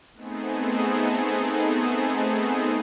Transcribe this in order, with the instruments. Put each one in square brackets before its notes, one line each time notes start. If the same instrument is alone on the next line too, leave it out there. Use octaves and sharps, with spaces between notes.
[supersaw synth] A3 B3 C4 D#4 G#4 A4